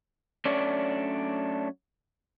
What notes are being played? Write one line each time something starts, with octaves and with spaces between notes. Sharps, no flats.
F#3 A3 C#4 D4 C#5 D5